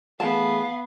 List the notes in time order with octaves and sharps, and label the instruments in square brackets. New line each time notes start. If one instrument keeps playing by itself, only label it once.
[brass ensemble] E3 A3 G#4 [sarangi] B3 [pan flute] F5 [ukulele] A5